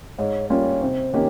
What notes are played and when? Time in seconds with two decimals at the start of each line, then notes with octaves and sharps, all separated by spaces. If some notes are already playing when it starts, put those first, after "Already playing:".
0.18 G#2 C#5
0.50 G3 A#3 C#4 F4 C#5
0.81 C3 C5
1.13 D#3 A#3 C#4 G4 C#5